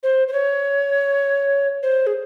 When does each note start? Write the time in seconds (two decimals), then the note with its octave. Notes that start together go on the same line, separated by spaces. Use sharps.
0.03 C5
0.28 C5
0.33 C#5
1.83 C5
2.07 G#4